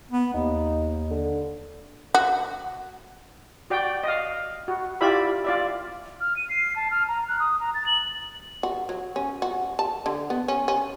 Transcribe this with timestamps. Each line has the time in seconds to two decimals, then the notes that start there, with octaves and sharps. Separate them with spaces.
0.11 B3
0.34 D#2 D#4
1.10 D3
2.15 F#4
3.70 F#4 D5 G5
4.04 D#5 F5
4.68 F#4
5.01 E4 F4 G4 D5 E5 B5
5.44 F4 D5 E5
6.21 F6
6.36 D#7
6.49 C7
6.76 A5
6.91 F6
7.08 A#5
7.28 F#6
7.40 D#6
7.60 A#5
7.74 A6
7.86 F#7
8.63 F#4
8.89 F#3
9.16 C#4
9.42 F#4
9.79 A5
10.06 D3
10.30 B3
10.48 C#4
10.68 C#4